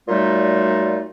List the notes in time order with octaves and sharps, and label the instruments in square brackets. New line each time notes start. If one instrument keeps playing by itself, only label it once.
[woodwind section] A#2 F#3 G3 A3 D#4 F4